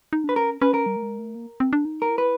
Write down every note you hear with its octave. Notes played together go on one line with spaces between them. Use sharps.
D#4
D4 B4
C#4 A#4
C#4 B4
A#4
G3
A3
G#3
A3
A#3
C4
D4
D#4
A#4
E4
B4